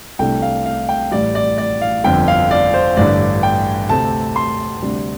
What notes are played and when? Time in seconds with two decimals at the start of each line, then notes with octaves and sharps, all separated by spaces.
0.19 C2 C3 A3 D4 G5
0.42 F5
0.66 F5
0.89 G5
1.11 A1 A2 G3 D5
1.35 D5
1.58 D5
1.81 F5
2.04 G1 F2 D3 G5
2.28 F5
2.51 D5
2.74 C5
2.97 A1 G2 D3 D5
3.43 G5
3.89 D2 C3 A3 C4 A5
4.36 C6
4.82 D2 C3 G3 D4